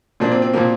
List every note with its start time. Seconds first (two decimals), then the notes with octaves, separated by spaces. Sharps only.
0.20 A#2 F3 A#3 D4
0.32 C4
0.42 C4
0.53 A#2 F3 A#3